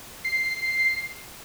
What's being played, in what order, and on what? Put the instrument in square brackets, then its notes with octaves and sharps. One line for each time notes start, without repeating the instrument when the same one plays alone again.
[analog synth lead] C7